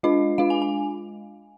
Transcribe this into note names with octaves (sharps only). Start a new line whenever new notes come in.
G#3 D4 F4 D#5
G#3 D4 F4 F5
G#5
G#5